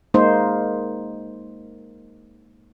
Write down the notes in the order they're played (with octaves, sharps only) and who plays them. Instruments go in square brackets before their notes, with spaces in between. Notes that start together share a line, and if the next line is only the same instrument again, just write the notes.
[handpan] G#3 A#3 D#4 C5